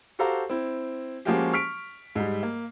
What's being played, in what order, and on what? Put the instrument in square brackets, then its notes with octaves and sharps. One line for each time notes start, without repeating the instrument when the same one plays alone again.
[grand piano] F#4 G4 A4 C5 F5 A#5
C4 E4
F3 G#3 A#3 C#4 F#4 G4
C#6 F6 B6 D7
G#2 G3
A#3